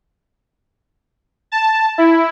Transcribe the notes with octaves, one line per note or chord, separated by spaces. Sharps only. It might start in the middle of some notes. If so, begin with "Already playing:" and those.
A5
E4